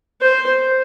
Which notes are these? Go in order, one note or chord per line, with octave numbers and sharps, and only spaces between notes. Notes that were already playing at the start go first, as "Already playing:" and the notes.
C5